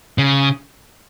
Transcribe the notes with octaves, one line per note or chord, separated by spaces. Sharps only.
C#3